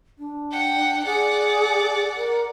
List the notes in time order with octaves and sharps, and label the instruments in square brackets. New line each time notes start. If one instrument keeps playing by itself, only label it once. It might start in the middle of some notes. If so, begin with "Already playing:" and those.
[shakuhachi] D4
[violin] F#5 G5
[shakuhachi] G#4 [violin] D5 F#5
[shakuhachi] A#4